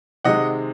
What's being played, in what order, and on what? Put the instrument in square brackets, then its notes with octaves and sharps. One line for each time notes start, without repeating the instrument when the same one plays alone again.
[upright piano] C3 D#3 G#3 D#5 F#5